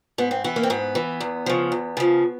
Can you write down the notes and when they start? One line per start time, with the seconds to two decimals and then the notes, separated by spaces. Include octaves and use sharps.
0.18 G#2 B3
0.31 C4
0.44 E3 B3
0.56 A#3
0.63 C4
0.70 G#2 B3
0.95 E3
1.21 E2
1.46 C#3 F3
1.72 E2
1.97 C#3 F3